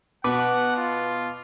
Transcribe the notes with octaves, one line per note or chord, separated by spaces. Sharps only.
B2 B4 F#5 D6
F4